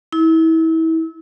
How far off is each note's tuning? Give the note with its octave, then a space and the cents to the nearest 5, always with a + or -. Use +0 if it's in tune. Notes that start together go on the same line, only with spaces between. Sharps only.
E4 -30